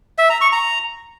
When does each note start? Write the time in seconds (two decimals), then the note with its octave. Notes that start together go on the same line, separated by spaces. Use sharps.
0.18 E5
0.30 A#5
0.41 C#6
0.52 A#5